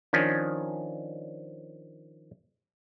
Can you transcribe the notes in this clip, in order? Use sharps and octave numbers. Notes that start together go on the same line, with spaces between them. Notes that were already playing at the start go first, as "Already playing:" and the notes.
D#3 F3 C#4 D4